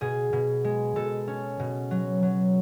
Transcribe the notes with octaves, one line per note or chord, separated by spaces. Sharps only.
B2 G#4
B2
G#3
B2 A4
C#4
B2
F#3
F#3